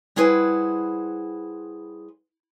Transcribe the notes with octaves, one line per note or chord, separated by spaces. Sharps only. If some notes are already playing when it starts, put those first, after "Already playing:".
G3 E4 G#4 B4 C5 F#5